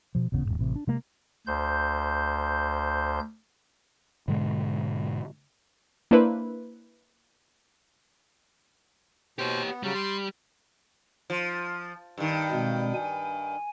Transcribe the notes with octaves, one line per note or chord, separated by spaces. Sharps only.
B2 F3
D#1 A1 C#3 B3
D#1 E2 G#2
A1 C3
D4
C3 G#3 A#3
D2 C5 G6
G#2 B2 D3 G#3
A#3 D4 E4 B4 C5
B2 G4 C5 C#5
B3
C#3 F#3 G3
C6
F3
G2 D#3
B2 G#3 C4
G#5